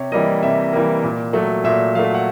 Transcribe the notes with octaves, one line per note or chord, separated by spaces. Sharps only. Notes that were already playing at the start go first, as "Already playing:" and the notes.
Already playing: C3 C#5
E3 G3 A#3 D#5
C3 E5
E3 G3 A#3
A#2
F#3 A3
A#2 E5
F#3 A3 F5
F#5